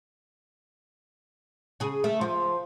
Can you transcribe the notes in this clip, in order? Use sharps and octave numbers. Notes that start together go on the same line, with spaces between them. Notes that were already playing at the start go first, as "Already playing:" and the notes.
C#3 G#4
A3
F3